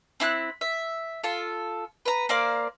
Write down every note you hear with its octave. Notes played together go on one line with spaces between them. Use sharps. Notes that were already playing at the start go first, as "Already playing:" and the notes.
C4 E4 C6 F#6
E5
F4 A4
B4 A#5
A#3 C5 D5 F5